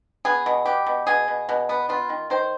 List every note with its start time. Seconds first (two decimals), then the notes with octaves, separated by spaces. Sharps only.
0.25 B3 G#4
0.46 B2
0.65 B3 G4
0.87 B2
1.07 B2 G#4
1.28 B2
1.49 B2
1.69 B3
1.89 B3 F4
2.09 D#3
2.30 D#3 C5